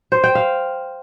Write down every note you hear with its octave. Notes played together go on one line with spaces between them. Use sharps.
C5
G5
F5